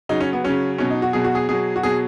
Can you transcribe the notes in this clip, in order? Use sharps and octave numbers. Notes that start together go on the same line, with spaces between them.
C#3 F#3 D#4
C#4
B3
C#3 F#3 C#4
B2 F#3 C#4
D#4
F#4
B2 F#3 G#4
F#4
G#4
B2 F#3 G#4
F#4
B2 F#3 G#4